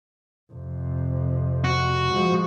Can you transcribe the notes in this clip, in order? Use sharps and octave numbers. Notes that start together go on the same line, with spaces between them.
F2 C3
F#4
F3 G#3